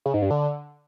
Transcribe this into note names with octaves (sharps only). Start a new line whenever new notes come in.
C#3
G#2
G2
D3